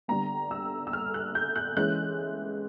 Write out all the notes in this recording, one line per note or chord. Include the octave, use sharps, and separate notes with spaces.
D3 G3 B3 A#5
E6
E6
F6
F#6
G6
F#6
E3 G#3 C#4 F#6